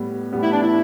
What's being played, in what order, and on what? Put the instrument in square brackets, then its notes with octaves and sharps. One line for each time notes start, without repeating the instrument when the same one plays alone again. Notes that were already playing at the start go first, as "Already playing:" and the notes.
Already playing: [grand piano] A2 G3 B3
A2 G3 B3
[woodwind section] E4
D4
E4